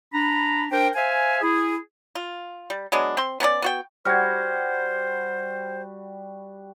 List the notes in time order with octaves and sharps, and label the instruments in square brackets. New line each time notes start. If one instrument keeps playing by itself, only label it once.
[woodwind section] D4 A#5 B5
D4 A#4 C5 G5
C5 E5 F5 G#5
E4 G#4
[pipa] F4
G3
F#3 G#3 B3 D4
C4 C6
B3 C#4 A#4 D5
B3 F#4 G5
[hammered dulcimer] G3 F#4 [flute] C5 [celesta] F6 G#6